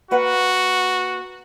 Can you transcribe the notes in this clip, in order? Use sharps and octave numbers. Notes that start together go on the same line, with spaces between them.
A#3 F#4 B4 F#5